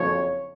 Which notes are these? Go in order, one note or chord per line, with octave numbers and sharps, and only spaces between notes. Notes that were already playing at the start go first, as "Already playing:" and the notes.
Already playing: F#1 F2 C#3 F3 C#5